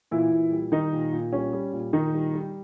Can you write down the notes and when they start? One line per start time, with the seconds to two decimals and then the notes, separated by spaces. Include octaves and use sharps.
0.11 A#2 E3 E4
0.31 A#2
0.52 G3
0.72 D#3 G3 D#4
0.93 A#2
1.13 A#2
1.32 G3 C#4
1.53 G3
1.73 A#2
1.93 A#2 D#3 D#4
2.14 G3
2.34 G3